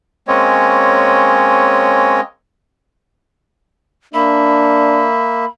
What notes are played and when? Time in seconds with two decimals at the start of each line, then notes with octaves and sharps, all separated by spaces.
0.28 G#3 A#3 C4 C#4 C#5 D#5
4.14 A#3 D4 E5 B5